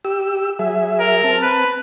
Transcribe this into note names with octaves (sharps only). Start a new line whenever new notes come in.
G4 E6
F#3 G#4 E5
A#4
C4 A5
B4